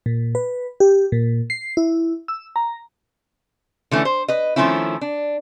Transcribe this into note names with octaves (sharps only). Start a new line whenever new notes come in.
A#2
B4
G4
A#2
C7
E4
E6
A#5
D3 E3 A3 C#4
C5
B4 D#5
D#3 F3 A3 C4 C#4 E4
D4